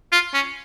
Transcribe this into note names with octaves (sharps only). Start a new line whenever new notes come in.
F4
C#4